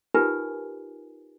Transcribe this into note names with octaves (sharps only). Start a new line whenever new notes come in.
D#4 F4 G4 A#4 B4 G#5